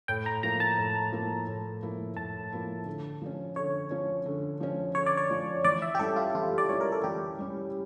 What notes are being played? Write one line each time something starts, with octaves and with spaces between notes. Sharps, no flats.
A2 G5
A#5
F3 A#3 E4 A#5
A5
A2
F3 A#3 E4
A2
F3 A#3 E4
A2 A5
F3 A#3 E4
D3
F3 C#4
D3 C#5
F3 C#4
D3
F3 C#4
D3 C#5
D5
C#5
F3 C#4
E3 D5
E5
G4
G3 C#4 E4 A4
F4
E3 F4
D5
G3 C#4 E4 C#5
A#4
A4
E3 G4
G3 C#4 E4